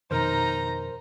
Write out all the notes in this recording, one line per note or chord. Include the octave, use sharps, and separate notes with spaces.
F2 B2 D#3 D#4 A#4 C5 A#5